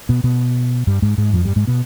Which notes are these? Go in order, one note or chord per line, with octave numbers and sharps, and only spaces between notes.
B2 B3
B2 B3
G2 G3
G#2 G#3
G#2 G#3
F2 F3
G2 G3
G#2 G#3
B2 B3